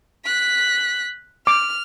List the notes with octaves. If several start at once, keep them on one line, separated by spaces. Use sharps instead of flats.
F#6 B6
D6 F6